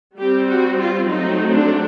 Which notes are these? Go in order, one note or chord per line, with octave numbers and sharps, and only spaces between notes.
G3 C4 G4
F#4
F4
F#3 A3 C4 D#4
D4